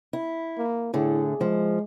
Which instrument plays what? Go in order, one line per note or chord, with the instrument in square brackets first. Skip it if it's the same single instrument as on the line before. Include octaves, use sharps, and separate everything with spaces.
[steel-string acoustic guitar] E4
[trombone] A#3
[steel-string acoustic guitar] A2 D3 [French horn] E4 [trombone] G#4
[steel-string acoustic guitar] F3 [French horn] G#3